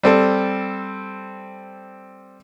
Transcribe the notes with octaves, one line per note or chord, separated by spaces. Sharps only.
G3 C4 A4